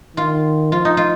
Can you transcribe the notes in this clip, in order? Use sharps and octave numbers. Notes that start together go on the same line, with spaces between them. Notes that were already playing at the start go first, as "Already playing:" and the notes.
D#3 F4
F3 F4
D#4
F4